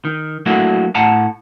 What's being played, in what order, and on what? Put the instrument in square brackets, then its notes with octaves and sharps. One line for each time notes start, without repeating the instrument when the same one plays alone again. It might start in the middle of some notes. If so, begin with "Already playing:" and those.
[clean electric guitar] D#3
F#3 A3 A#3 D4 E4 F#4
A2 F#5 A5 A#5